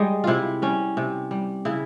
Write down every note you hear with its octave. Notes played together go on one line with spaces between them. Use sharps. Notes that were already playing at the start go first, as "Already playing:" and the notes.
Already playing: G3 G#3
C3 E4 F4
G3 C#4
C3
G3
C#3 E4